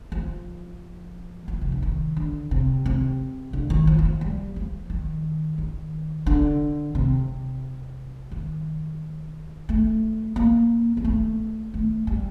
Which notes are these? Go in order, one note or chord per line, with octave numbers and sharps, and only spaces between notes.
F3
F3
C3
D3
D#3
D3
C3
C3
D3
D#3
F3
D#3
F3
G3
F3
D#3
D#3
D3
C3
D#3
A3
A#3
A#3
A3
A3
G3